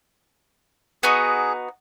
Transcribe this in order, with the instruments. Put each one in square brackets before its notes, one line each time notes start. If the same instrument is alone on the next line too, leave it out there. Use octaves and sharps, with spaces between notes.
[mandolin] B3 D#4 F#4 [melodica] G#4